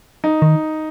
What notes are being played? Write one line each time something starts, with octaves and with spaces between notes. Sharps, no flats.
D#4
D#3